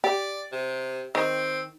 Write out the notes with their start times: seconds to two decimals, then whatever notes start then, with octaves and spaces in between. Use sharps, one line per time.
0.04 G4 D5
0.52 C3
1.15 D#3 C4